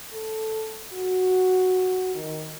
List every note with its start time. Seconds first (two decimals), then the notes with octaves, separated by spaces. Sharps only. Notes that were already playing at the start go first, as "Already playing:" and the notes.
0.13 A4
0.94 F#4
2.15 D#3